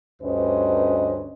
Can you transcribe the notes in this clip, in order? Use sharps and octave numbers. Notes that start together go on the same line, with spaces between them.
D2 G2 C#4 B4 C5 D#5